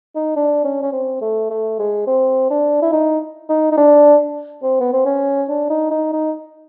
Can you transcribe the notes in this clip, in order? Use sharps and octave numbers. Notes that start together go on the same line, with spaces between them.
D#4
D4
C#4
C#4
C4
A3
A3
G#3
C4
D4
E4
D#4
D#4
D#4
D4
C4
B3
C4
C#4
D4
D#4
D#4
D#4